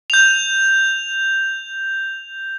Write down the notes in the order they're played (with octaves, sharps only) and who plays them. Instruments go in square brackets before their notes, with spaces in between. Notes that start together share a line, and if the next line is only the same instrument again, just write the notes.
[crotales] G6 F7